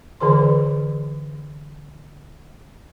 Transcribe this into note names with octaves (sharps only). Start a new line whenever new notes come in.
D3 E3 G#4 C5 C6